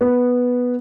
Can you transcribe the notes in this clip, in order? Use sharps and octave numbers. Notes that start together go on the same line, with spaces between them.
B3